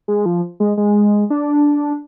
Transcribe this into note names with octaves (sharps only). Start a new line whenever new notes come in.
G#3
F3
G#3
G#3
D4